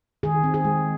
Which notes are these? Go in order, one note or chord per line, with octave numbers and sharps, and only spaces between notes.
D#3 G#4
C4
G#4
G#3